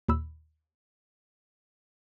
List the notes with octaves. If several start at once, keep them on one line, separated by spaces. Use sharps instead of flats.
D#2 A#2 B5 E6